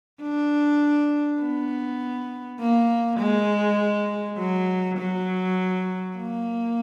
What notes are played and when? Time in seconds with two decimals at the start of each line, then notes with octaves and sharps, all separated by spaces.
0.22 D4
1.41 B3
2.60 A#3
3.19 G#3
4.38 F#3
4.98 F#3
6.16 A#3